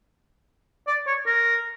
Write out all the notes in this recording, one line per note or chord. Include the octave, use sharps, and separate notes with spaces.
D5
C#5
A#4